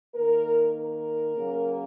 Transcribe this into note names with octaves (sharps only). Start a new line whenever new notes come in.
D#3 A#3 A#4
A#4
C#3 F#3 A#3